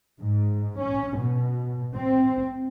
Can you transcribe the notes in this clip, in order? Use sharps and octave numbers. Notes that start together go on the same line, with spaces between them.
G#2
C#4
B2
C4